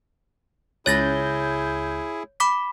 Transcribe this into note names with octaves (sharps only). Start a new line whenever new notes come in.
C#2 E4 G#4 C#5 G6 A6 A#6
B5 D6 B6